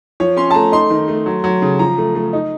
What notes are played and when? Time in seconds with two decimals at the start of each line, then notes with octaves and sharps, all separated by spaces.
0.20 F3 C#5
0.37 C#4 C6
0.50 A5
0.54 A3 A#5
0.72 D#4 C6
0.90 D#3
1.08 A3
1.26 F#3
1.44 F#3
1.62 C#3
1.79 F3 A#5
1.98 A3
2.15 A3
2.33 D#4